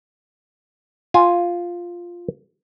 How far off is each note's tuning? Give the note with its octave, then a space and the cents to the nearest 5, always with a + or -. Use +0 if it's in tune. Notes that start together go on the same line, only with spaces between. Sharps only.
F4 +0 G#5 +0